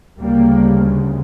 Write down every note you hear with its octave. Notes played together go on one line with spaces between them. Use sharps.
D2 C#3 G3 A#3